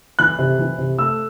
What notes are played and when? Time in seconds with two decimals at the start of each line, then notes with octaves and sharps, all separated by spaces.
0.19 E3 F#6
0.39 C3
0.59 E3
0.78 C3
0.99 A3 E6